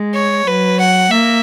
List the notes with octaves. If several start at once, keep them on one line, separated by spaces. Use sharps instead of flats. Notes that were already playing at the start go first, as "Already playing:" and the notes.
Already playing: G#3
C#5
F#3 B4
F#5
A#3 E5